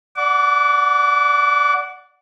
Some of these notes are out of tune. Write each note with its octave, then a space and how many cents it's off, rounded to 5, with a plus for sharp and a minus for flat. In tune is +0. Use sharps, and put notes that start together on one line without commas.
D5 +0 F#5 +0 D6 -35